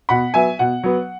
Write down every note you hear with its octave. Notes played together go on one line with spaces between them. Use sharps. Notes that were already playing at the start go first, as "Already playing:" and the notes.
B2 F#5 B5
F#3 B3 E5 G#5
B2 F#5
F#3 B3